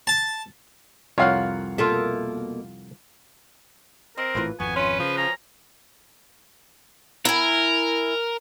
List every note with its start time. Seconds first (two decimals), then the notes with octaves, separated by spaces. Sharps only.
0.07 A5
1.18 C2 F2 F4 A#4 C#5 F5 F#5
1.78 B2 A#3 F4 A4 E5
4.17 C4 A#4 D#5
4.35 G#1 A2 E3 A#3 F4 B4
4.60 G#1 F2 B3 F#4 G#5
4.76 C#4 F4 B4 C6
5.00 C#3 F3
5.17 B2 C#4 A#5
7.25 E4 A#4 G#5